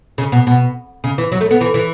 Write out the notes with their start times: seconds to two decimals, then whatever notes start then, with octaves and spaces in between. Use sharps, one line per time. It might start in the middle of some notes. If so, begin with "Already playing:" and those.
0.18 C#3
0.32 B2
0.47 B2
1.04 C#3
1.18 E3
1.32 F#3
1.41 A3
1.51 B3
1.61 E3
1.74 E3